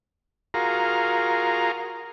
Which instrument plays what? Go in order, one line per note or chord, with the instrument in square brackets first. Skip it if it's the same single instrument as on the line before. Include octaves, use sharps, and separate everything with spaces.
[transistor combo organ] F4 F#4 G#4 A#4 F5 A#5